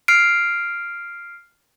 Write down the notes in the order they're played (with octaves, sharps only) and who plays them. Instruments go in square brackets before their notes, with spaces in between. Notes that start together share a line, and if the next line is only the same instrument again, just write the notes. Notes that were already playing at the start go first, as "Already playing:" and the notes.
[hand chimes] F6 C7 D7